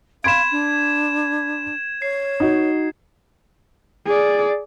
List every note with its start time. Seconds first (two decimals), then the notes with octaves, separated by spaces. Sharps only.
0.24 F5 B5 C6 G#6 D7 E7
0.51 D4
2.02 C#5 C7
2.40 D#4 F#4 D#5
4.06 G#4 D5